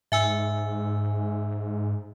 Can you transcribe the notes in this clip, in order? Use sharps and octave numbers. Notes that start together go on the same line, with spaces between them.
G#2 E5 G#5 E6